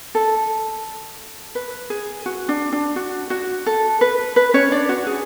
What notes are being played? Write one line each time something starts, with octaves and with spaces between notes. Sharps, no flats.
A4
B4
G#4
F#4
D4
D4
F#4
F#4
A4
B4
B4
C#4 C#5
D4 D5
F#4
G#4